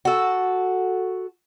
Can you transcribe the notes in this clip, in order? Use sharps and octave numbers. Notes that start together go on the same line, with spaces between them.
F#4 A4